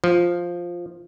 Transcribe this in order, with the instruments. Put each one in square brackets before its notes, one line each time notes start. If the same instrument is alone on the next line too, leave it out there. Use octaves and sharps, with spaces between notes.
[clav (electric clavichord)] F3